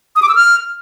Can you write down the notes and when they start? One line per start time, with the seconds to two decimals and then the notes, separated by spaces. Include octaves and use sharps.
0.16 D#6
0.22 D6
0.29 E6
0.35 F6